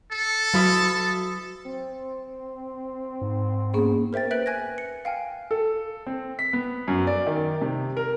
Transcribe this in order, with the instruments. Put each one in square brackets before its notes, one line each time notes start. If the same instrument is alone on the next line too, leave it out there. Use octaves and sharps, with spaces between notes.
[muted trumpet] A4
[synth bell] F#3 F#4 D#6
[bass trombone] C4
[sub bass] G#2
[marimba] A#3 B3 C#4 [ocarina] G#4
[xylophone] A#4 C5 E5 G5 A6
B4 E5 F#6 G6 D7 F#7
G#5 F#6 G#6 A#6
C#7
F5 G5 G#5 F6
[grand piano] A4
C4
B6
B3
F#2
D5
D#3
C3
A#4